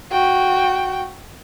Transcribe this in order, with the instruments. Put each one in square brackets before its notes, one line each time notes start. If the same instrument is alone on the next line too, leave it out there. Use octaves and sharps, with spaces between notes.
[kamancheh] F#4 G5